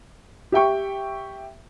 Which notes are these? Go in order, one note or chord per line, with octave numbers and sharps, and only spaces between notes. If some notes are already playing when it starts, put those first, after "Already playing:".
G4 E5 G5 C#6